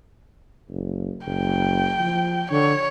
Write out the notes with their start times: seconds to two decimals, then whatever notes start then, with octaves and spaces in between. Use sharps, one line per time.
0.69 F#1
1.27 F#1 G5
2.00 F3
2.51 D3 C#5